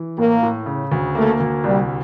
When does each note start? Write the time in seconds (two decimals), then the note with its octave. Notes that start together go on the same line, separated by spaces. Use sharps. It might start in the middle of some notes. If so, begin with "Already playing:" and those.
Already playing: E3
0.17 A2 A#3
0.43 A2
0.66 C#3
0.92 D2
1.15 A3 A#3
1.40 D2
1.64 C2 G3